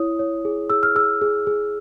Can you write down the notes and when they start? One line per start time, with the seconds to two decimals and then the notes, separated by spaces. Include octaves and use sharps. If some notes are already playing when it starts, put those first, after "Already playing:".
Already playing: E4 C#5 D#6
0.19 C#5
0.45 G#4
0.70 G#4 E6
0.83 F6
0.95 G#4 E6
1.22 G#4
1.47 G#4